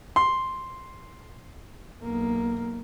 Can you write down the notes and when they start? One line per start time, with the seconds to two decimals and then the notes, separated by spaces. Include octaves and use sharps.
0.16 C6
2.02 B1 A#3